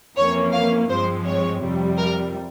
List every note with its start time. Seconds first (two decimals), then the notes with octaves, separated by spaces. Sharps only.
0.17 F2 E3 A#3 C#4 C#5
0.53 F5
0.90 G2 F3 G#3 C4 C5
1.25 C#5
1.62 F2 C3 G3
1.98 A#4